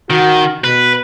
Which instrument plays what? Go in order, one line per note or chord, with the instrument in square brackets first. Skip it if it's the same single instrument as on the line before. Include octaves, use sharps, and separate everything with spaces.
[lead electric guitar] D#3 [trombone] F#4
[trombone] B2 [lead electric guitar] B4